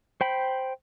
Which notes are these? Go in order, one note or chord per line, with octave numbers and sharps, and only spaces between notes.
C5 G5 B5